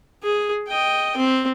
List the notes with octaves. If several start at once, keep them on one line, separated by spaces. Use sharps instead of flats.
G#4
D#5 G5
C4